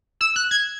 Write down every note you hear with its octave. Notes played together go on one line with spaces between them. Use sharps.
E6
F#6
G#6